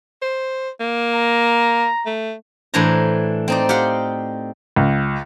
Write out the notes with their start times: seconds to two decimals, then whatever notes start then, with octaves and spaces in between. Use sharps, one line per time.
0.22 C5
0.80 A#3
1.15 A#5
2.06 A3
2.74 A2 E3 D4 C5 A#5
3.48 C4 D#4 D5
3.69 G4 F5 F#5 C6
4.76 C#2